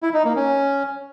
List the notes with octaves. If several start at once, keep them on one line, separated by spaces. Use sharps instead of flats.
E4
D#4
A#3
C#4